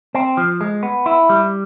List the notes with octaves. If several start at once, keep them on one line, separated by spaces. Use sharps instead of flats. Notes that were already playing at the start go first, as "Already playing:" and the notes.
C4
F3
G#3
B3
E4
G3